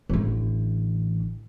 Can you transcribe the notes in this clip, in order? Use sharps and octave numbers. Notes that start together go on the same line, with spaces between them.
A1 D3